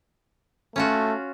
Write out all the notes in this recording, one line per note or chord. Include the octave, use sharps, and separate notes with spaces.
A3 C#4 F4 F#4